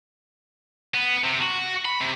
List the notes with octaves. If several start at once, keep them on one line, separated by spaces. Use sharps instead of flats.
B3
C3
F#4
B5
C3